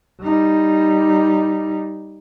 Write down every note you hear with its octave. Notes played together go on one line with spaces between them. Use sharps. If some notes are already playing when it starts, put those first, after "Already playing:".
G3 D#4